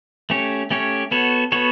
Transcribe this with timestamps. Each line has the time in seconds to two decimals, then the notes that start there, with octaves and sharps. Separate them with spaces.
0.30 A3 C#4 G4 C#5
0.71 A3 C#4 G4 C#5
1.11 B3 F#4 A4 C#5
1.52 B3 F#4 A4 C#5